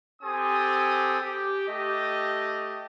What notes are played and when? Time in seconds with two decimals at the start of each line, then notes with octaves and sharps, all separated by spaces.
0.22 C4 G4 A4 G#5 D#6
1.21 G4
1.67 A3 G4 D#5